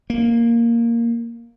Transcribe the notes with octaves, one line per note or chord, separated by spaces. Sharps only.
A#3